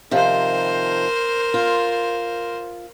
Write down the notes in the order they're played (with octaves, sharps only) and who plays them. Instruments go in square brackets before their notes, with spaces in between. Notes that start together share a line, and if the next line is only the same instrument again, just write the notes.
[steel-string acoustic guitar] C3 D#3 F3 [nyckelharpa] A#4 C5
[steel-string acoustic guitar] F4